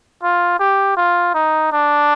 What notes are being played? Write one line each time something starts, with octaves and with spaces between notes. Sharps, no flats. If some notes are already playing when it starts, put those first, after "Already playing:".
F4
G4
F4
D#4
D4